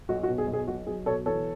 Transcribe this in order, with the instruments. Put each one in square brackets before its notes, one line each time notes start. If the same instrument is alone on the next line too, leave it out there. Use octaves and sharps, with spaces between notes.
[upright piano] B1 F#4
F#4
B2
G#4
B1
G#4
B1 F#4
F#3 G#4
B2 A4 C#5
E3 A4 C#5